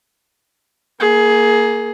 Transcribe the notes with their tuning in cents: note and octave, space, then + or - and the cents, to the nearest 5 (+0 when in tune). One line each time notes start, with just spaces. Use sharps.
A#3 +0 G#4 +15